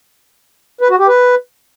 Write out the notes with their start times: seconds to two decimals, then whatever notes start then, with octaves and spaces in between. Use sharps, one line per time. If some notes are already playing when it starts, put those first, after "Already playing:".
0.81 B4
0.90 F#4
0.99 G4
1.08 B4